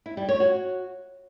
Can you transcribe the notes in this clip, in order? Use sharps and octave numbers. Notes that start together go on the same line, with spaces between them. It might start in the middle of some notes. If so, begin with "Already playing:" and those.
E4
G3
C#5
F#4